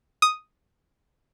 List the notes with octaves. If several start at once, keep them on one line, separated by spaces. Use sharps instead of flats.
D#6